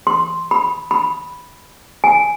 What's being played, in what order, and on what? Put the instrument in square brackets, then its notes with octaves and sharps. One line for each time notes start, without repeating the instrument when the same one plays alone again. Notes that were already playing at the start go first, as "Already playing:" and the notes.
[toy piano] C6
B5
B5
G#5